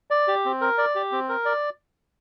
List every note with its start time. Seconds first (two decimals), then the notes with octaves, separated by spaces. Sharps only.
0.11 D5
0.28 G4
0.45 C4
0.61 A#4
0.78 D5
0.95 G4
1.12 C4
1.29 A#4
1.45 D5